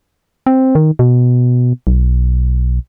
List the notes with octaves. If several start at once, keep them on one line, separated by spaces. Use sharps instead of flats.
C4
D#3
B2
B1